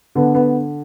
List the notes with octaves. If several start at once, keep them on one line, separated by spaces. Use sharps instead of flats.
D3 B3
B3